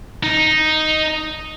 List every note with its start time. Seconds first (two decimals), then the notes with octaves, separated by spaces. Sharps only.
0.23 D#4